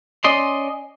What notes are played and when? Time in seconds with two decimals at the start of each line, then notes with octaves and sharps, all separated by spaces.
0.24 C#4 D5 D#5 C6